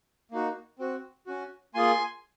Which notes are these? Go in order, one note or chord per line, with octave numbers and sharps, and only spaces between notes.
A#3 D#4 F#4
C4 F#4
C#4 F#4
A#3 F4 G#4 G#5 C6